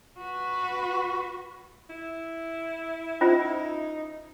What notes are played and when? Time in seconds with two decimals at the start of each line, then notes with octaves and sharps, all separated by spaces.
0.19 F#4 B4
1.90 E4
3.21 C#4 D#4 F4 C5